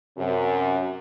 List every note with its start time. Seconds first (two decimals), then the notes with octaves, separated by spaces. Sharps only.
0.18 F#2 C3